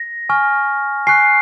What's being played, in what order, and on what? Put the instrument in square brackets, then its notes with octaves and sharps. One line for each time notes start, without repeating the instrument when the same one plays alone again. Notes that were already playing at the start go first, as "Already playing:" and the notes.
Already playing: [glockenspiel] A#6
G#5 C#6 F6
G#5 C#6 F#6 C7